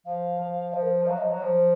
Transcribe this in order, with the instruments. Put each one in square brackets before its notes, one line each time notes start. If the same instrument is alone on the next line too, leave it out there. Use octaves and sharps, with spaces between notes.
[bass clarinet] F3 [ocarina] F5
[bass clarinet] F3
[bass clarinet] F3 [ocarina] C5
[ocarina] A#4
C5
[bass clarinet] F3
[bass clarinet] F#3 [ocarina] F5
[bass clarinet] F3 [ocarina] D#5
[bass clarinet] F#3 [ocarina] C#5
[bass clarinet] F3 [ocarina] C5 C#5